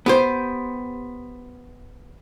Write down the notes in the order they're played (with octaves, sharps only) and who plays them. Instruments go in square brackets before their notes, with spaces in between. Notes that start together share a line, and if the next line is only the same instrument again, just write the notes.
[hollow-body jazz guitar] B3 G4 C5